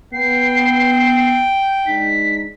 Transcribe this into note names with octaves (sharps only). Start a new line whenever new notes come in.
B3 G5 C7
G#3 D4 D#4 B6